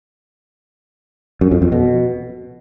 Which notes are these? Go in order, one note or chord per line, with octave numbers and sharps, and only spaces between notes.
F#2
F2
F2
B2